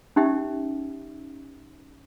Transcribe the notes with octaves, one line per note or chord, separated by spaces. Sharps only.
C#4 D#4 G4 E5